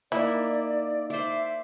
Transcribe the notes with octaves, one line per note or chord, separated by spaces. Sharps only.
A#3 D#4 E4 D5 D#5
C5 D5 E5